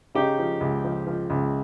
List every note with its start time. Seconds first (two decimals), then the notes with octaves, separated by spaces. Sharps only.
0.15 C#3 D#4 G4
0.39 F3
0.61 C#2
0.84 F3
1.07 F3
1.30 C#2